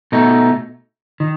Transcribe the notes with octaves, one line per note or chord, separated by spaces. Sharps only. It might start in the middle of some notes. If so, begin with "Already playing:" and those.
B2 A3 D#4
D#3